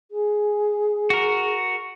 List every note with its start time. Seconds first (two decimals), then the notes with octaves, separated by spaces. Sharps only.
0.11 G#4
1.10 F#4 A#4